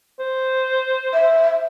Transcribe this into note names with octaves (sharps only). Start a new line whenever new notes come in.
C5
E5